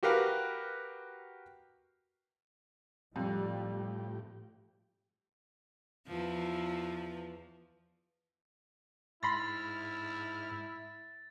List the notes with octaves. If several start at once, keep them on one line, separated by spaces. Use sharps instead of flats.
F#4 G4 A#4 B4 F5
F2 A2 F3 G3 G4
E2 E3 F3
G#2 E4 B5 C6 F6 A6 A#6